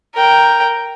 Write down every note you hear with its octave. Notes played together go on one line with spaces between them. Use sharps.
A#4 G5